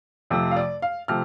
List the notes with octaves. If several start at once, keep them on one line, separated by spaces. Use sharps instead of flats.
F2 C3 F3 A3
F5
D5
F5
C3 F3 A3 F6